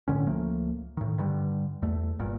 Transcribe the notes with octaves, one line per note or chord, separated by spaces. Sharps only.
A2 D3 C#4
C#2 F3 A3 A#3
A2 D#3
G2 D3 G3
E2 A3
G1 G2 A#2